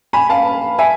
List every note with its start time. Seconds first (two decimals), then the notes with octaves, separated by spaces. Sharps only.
0.13 G#5 B5
0.29 F5 A5
0.79 E5 G#5